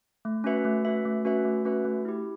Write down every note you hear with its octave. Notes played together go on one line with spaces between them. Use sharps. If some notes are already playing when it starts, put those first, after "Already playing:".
A3
C#4 F#4 B4 E5
A3
C#4 F#4 B4 E5
A3
C#4 F#4 B4 E5
A3
C#4 F#4 B4 E5
A3
E4 G4